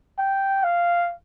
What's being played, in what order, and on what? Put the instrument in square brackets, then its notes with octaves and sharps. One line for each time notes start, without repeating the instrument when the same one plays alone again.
[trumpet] G5
F5